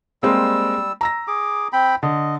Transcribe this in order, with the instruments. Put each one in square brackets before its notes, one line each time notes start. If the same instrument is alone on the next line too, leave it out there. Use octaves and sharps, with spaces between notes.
[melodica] G3 E6 [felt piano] G#3 A#3 C4
[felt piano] A#5 E6 A#6
[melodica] G#4 D6
C4 G5 B5
[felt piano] D3 [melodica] D#5